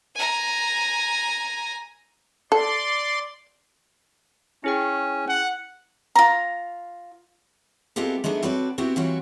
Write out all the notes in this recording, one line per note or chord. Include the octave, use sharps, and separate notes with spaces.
G#5 A#5
A4 D5 C6
C#4 E4 G#4 G5
F#5
F4 A#5
G#3 B3 C4 F4 G4 A4
G#3 A3 B3 D4 D#4
C4 F#4 A4 B4 C#5 D5
B3 C4 E4 F#4 G4
E3 G3 C4 F4 F#4 C#5